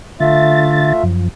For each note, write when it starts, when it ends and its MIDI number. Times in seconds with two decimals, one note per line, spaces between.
0.20 0.93 50
0.20 1.03 57
0.20 1.03 65
0.20 1.03 76
0.20 0.93 93
1.03 1.29 42
1.03 1.29 53